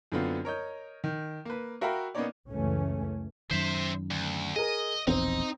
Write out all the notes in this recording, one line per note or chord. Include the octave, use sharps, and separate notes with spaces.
F#2 D3 B3 C4 F4
A#4 C#5 D#5 G6
D#3
A#3 B4
F#4 A#4 E5 F5 G5 B5
A#3 B3 C#4 D#4 C#5 D5
C#2 F#2 E3 A3 C#4
F#2 D#3 C5 E5
D2
G#4 A#4 D#5
E1 A#1 E2 C4 D#4